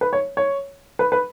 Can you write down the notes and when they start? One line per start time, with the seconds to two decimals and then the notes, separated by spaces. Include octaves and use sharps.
0.01 B4
0.13 C#5
0.37 C#5
0.99 B4
1.12 B4